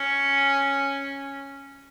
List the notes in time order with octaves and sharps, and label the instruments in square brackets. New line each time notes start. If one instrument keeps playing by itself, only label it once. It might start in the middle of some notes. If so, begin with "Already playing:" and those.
Already playing: [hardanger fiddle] C#4